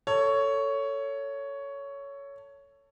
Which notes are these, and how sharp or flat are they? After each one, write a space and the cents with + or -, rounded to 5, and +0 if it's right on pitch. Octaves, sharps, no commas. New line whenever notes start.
A4 +20 C#5 +10